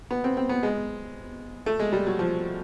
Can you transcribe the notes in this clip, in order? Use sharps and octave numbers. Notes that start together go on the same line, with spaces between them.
B3
C4
C4
B3
G#3
A3
G#3
G3
F#3
F3